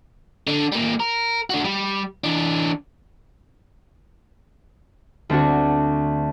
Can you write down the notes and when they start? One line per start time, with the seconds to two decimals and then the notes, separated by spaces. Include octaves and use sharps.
0.47 D3 D4
0.72 G3 A#3
1.00 A#4
1.50 D4 F#4
1.65 G3
2.24 E3 D4
5.30 D2 C4 D4 F#4